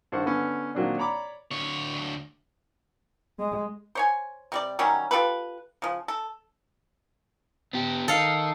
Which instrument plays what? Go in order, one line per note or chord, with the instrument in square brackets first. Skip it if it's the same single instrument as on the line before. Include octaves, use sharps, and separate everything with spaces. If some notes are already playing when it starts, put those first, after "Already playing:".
[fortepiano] G2 D#3 C5 F#5 C#6
D3 B3 C#4
A#2 D#3 F#3 C4 D4
C#5 D5 A#5 B5 D6
[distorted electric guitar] D2 C#5
[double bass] G#3
[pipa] C5 C#5 G#5
C3 G3 D5
D#3 F#3 G3 C#4
F4 G4 A4 B4
C#3 F3
A4
[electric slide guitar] B3 G4
[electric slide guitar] D#3 D#4 [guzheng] A4 F5